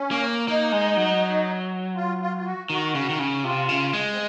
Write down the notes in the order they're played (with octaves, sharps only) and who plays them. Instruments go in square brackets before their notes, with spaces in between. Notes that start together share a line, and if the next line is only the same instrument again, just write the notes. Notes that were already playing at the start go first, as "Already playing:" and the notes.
Already playing: [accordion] C#4
[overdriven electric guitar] A#3
[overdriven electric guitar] A#3 [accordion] D#4
[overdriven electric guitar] G#3
F#3
[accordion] F4
F4
F4
F#4
[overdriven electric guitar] D#3 [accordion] F#4
[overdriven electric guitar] C#3
D#3
C#3
[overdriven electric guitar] C3 [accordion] F4
[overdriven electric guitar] C#3
G#3
[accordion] C4